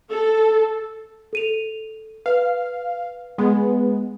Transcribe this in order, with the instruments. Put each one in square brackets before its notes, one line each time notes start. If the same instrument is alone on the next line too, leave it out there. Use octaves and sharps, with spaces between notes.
[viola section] A4
[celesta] A4 D#7 F7
[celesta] B4 [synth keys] F5
[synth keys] G#3 B3